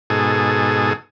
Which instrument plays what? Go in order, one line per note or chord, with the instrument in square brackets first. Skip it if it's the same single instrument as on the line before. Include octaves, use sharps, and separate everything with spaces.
[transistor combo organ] G#2 B2 G#4 A4